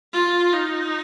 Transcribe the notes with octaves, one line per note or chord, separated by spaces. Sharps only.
F4
D#4